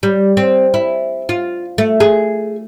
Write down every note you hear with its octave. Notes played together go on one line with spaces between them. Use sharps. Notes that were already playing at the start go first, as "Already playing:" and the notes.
G3
C4
E4
F4
A3
G#4